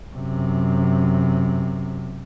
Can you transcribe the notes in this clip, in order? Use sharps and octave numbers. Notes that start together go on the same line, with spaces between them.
F#2 C3